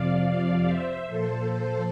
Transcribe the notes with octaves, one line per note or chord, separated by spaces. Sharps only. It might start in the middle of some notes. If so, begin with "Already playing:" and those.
Already playing: F2 C3 F3 D5 F5
C5 E5
A#2 F3 A4 C5